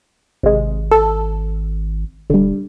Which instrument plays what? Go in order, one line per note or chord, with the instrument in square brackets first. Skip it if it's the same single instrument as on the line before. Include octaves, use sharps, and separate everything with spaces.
[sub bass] G#1 [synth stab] C3 G#3
[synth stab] A4
[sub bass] D#1 [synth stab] D3 G3